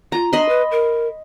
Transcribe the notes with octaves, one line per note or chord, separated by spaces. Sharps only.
F4 A#5
D4 D#5 B5 C6
B4
A#4